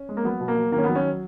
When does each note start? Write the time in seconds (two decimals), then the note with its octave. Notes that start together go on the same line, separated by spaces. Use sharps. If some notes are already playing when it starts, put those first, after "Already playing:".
Already playing: C#4
0.09 G#3
0.17 A#3
0.24 F#3 B3
0.40 B2
0.48 A#3
0.57 F#3
0.72 D#3 A#3
0.78 C#4
0.84 F#3 B3
0.95 C#4